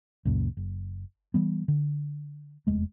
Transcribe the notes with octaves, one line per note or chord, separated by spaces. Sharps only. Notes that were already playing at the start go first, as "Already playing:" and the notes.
C#2 F#2 A#2
F#1
E3 G3 B3
D3
F1 E2 G#3 A3